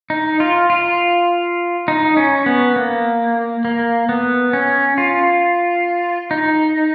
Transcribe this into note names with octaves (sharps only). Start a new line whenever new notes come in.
D#4
F4
F4
D#4
C#4
B3
A#3
A#3
B3
C#4
F4
D#4